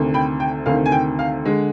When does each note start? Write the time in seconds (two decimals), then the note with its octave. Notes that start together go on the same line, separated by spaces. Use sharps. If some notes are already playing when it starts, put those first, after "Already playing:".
Already playing: D2 C3 D#3
0.14 G5 B5
0.40 G5
0.66 D2 C3 D#3 F5
0.86 G#5
0.92 G5
1.19 F5
1.45 D3 G#3